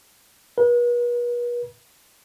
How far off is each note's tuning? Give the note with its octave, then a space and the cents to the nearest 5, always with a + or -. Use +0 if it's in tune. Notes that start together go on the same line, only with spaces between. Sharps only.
B4 -40